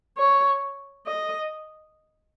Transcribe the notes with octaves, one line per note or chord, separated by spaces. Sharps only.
C#5
D#5